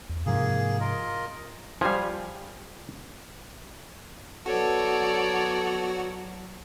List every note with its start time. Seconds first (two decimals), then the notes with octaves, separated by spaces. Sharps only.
0.09 E2
0.26 G#2 C3 F3 A#3 G#4
0.80 F4 A#4 D#5
1.81 F3 G3 F4 F5 G#5
4.46 F#3 B3 F#4 A4 C#5 D5